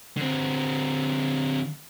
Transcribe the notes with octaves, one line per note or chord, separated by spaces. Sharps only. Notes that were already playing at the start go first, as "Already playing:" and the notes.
D3 C4